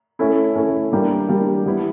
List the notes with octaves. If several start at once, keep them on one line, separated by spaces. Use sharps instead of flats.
A3 C#4 E4 A4
A3 C#4 E4 A4
G3 A#3 D4 G4 A#4
G3 A#3 D4 G4 A#4
G3 B3 E4